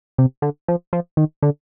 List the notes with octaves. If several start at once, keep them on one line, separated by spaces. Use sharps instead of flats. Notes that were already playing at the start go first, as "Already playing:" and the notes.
C3
D3
F3
F3
D#3
D3